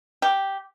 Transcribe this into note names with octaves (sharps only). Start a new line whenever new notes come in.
G4